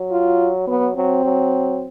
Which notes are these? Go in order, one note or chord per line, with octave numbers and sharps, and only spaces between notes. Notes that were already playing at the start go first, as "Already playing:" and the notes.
Already playing: F#3
F4
F#3 B3
F#3 C4
F#3